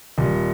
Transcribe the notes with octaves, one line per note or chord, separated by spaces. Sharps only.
D#1